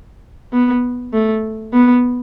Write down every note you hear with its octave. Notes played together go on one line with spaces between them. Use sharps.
B3
A3
B3